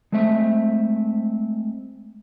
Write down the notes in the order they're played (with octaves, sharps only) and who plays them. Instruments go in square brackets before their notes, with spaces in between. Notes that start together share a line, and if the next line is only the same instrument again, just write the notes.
[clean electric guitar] G#3 A3 C4 E5